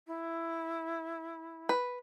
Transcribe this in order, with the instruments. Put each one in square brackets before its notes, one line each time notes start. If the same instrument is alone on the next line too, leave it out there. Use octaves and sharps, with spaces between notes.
[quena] E4
[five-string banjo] B4